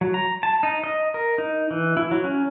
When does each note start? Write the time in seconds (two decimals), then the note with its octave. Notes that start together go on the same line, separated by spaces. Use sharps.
0.01 F#3
0.14 A#5
0.43 A5
0.63 D#4
0.84 D#5
1.14 A#4
1.38 D#4
1.71 E3
1.97 E4
2.11 F#3
2.24 C#4